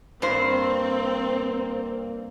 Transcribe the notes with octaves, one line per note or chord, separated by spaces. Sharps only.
G2 A#3 C4 C5